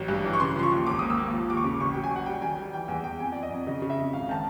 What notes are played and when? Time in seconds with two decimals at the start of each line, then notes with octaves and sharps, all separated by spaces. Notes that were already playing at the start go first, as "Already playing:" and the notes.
Already playing: A1 F#3
0.08 G2
0.25 E3
0.33 C#6
0.40 C#3 C6
0.56 F3 C6
0.63 C#6
0.72 D#2
0.86 G#1 D6
0.99 A#3 D#6
1.10 E6
1.17 A#3
1.33 F3
1.49 D#2 D6
1.57 C#6
1.64 C#3
1.80 A1 C#6
1.93 F#3 G5
2.04 G#5
2.11 F#3 F#5
2.26 G3 G5
2.42 D#3 G#5
2.58 G3 G5
2.73 E3 G5
2.88 E2 G#5
3.04 E2 G5
3.19 F2 G#5
3.32 F2 D5
3.43 D#5
3.51 F2
3.67 C#3 D#5
3.82 C#3
3.90 E5
3.98 F2
4.13 G#1 F5
4.29 D#3 A5